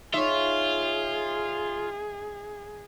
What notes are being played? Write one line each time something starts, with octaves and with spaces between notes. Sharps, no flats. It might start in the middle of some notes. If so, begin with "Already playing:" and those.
D#4 F4 G#4 C#5 E5